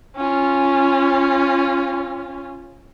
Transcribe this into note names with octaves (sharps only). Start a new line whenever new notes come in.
C#4 F4